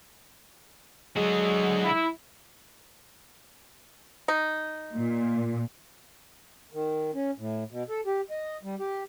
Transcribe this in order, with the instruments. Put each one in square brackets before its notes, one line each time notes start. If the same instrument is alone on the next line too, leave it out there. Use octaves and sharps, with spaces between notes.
[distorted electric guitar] D3 F#4 [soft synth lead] F#3 [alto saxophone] G#3
[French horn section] E4
[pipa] D#4
[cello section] A#2
[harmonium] D#3
C#4
A2
B2
A4
G4
D#5
G3
G4